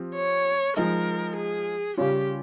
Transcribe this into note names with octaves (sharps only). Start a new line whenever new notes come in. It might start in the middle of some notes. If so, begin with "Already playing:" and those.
Already playing: F3 C4 G4
C#5
F3 G#3 D#4 A#4
G#4
C#3 G3 C#4 F4 G4